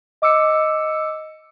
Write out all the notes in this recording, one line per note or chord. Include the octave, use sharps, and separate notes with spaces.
D#5 D6 E6 C#7